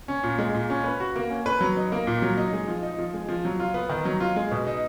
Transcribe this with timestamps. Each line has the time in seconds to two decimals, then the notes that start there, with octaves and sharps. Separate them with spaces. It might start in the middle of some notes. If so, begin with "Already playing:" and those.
0.08 C#4
0.23 A#2
0.38 G#3
0.55 A#2
0.70 C#4
0.84 B4
1.00 F#4
1.16 A#3
1.30 C#4
1.46 B4
1.61 F#3
1.77 D#4
1.92 A#3
2.07 A#2
2.22 F#3
2.37 D#4
2.53 G#3
2.67 F3
2.83 D#4
2.98 F3
3.14 G#3
3.29 F3
3.45 F#3
3.60 F4
3.74 B3
3.89 D#3
4.05 F#3
4.20 F4
4.36 G#3
4.52 B2
4.67 D#4